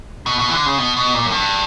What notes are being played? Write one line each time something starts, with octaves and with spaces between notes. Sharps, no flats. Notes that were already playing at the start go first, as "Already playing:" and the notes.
B2
B2
E3
D3
C#3
B2
B2
A#2
F#2
G2